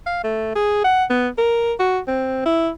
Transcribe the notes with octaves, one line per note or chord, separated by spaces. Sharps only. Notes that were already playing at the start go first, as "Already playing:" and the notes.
F5
A3
G#4
F#5
B3
A#4
F#4
C4
E4